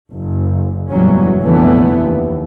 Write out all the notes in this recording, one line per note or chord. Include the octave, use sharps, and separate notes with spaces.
F#1 F#2
F#1 E2 A2 F#3 G3 C#4
F1 A#1 D3 E3 A3 B3
D#2